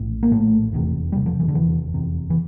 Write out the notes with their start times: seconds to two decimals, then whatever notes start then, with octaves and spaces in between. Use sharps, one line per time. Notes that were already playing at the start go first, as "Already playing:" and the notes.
Already playing: A#1 A2
0.23 A#3
0.31 A#1 A2 A3
0.73 F1 E2 C3
1.12 F1 E2 C3 G3
1.26 F3
1.40 E3
1.48 D3
1.54 F1 E2 C3 E3
1.94 F1 E2 C3
2.30 E3